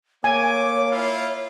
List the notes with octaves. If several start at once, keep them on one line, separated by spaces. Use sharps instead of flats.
A3 A#3 C#5 G#5 D6
E4 F4 F5